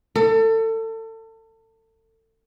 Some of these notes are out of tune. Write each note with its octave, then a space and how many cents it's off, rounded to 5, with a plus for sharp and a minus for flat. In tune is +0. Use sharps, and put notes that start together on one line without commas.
A4 +30